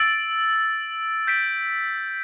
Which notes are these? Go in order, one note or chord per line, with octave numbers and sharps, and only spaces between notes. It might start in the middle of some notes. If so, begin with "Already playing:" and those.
Already playing: E6 A6 D7 F#7
G6 B6 D7